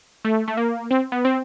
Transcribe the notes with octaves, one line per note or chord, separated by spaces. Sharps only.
A3
A3
A#3
C4
B3
C4